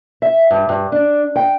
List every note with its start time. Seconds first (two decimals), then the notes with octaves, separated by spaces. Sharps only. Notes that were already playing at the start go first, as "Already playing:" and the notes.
0.22 E5
0.51 G2
0.69 G2
0.92 D4
1.36 G5